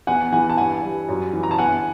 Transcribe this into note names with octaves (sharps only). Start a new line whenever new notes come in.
E2 F#5 G#5
E3 F#5 G#5
A5
G2 F#5 G#5
G3
F#2
E3
A#5
A5
G1 F#5 G#5